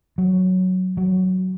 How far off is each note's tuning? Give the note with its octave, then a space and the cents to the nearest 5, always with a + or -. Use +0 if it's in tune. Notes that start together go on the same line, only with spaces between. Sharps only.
F#3 +0
F#3 +10